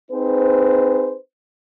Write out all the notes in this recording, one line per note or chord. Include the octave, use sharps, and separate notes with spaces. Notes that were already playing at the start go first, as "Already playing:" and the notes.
C4 D#4 G#4 B4 C5